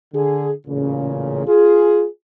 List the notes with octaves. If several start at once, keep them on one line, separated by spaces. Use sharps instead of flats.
D3 G#4
A1 A#2 C#3
F4 G#4